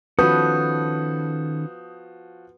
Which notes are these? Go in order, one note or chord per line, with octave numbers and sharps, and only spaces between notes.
D#3 F3 C#4 F#4 A4 B4 D#6 G6